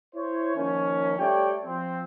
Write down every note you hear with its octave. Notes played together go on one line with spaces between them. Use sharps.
E4 C5 C#5
D#3 F3 A#3 C#4
G3 A3 G4 C#5 D5 G5
F3 C4